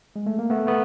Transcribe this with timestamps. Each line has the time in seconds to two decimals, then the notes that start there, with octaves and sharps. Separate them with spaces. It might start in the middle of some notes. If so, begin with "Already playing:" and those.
0.16 G#3
0.26 A3
0.39 A#3
0.50 A3 B3
0.67 A3 B3